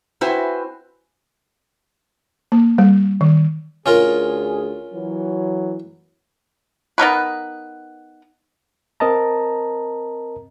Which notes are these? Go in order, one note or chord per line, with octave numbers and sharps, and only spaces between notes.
C4 E4 F#4 B4 C5 G#5
A#3
G3
D#3
D2 C#4 F4 G#4 A#4
E3 F#3
B3 D#4 A#4 B4
C4 A#4 D#5 A5 A#5